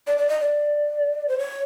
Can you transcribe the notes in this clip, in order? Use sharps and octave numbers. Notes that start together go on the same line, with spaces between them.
D5
D5
D#5
D5
C5
C#5